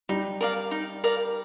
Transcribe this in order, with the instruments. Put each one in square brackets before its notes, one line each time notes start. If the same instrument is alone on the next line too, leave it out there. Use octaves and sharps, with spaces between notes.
[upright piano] G3 [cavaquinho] D#4
[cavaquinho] A#4 D5 F5
D#4
A#4 D5 F5